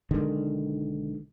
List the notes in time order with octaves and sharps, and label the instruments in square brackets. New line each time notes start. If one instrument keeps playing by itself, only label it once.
[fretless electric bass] B1 D3 D#3 G#3